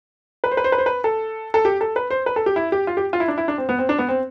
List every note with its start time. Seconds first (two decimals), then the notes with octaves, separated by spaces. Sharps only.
0.44 B4
0.51 C5
0.57 B4
0.64 C5
0.72 B4
0.78 C5
0.86 B4
1.04 A4
1.54 A4
1.65 G4
1.81 A4
1.96 B4
2.11 C5
2.26 B4
2.36 A4
2.46 G4
2.56 E4
2.72 G4
2.87 F4
2.97 G4
3.13 F4
3.20 E4
3.28 D4
3.38 E4
3.48 D4
3.58 C4
3.69 B3
3.79 C4
3.89 D4
3.99 B3
4.09 C4